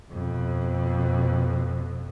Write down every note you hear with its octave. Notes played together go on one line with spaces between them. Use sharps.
F2 B2